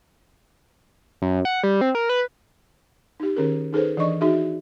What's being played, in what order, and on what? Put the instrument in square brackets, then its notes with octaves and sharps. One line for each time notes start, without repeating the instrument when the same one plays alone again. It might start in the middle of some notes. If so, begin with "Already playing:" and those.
[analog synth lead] F#2
F#5
G3
C4
A#4
B4
[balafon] D#4 G4
D#3 C#4 G#4 A#4
D#4 G#4 A4 B4 C5
E3 D4 D5 D#5 C#6
D#4 F#4 G#4 E5